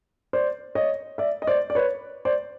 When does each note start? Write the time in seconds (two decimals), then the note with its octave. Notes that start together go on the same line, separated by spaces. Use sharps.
0.33 C5 D5
0.75 C#5 D#5
1.18 D5 E5
1.42 D#5
1.47 C5 D5
1.70 D5
1.75 B4 C#5
2.25 C5 D5